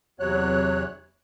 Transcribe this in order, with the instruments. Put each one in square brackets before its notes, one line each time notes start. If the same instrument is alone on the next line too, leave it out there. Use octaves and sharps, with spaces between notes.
[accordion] E2 C3 F#3 C#5 F#6